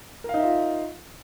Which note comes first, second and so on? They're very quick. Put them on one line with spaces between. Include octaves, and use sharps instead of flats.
A#4 F5 D#4 E5 F4